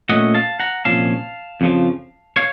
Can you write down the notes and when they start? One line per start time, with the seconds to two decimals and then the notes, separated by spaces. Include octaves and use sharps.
0.09 A#2 A3 C#4 D#5 F#5
0.35 F5 A5
0.60 F#5 A#5
0.85 C2 A#2 F3 C#4 F5 A5
1.61 F2 C#3 F3
2.36 C#5 F5